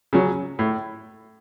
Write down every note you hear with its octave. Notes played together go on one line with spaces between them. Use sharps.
C#3 F#3
A2